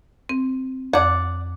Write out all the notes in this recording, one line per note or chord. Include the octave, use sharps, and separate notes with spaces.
C4
F2 D5 F#5 F#6